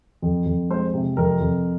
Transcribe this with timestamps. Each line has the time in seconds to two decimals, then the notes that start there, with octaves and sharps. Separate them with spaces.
0.22 F2
0.46 F2
0.70 G#3 C5
0.94 C3
1.17 F2 A#4
1.41 F2